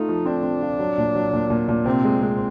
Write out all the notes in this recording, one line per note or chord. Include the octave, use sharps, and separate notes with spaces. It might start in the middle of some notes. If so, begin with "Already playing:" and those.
Already playing: A3 D#4 F4
F3
C4 D4
C4
F4
F#3
A#2
F#3
A#2
A#2
A#2
C3 C4
G#3
G#3